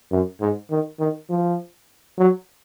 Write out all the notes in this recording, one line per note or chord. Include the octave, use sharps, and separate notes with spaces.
F#2
G#2
D#3
D#3
F3
F#3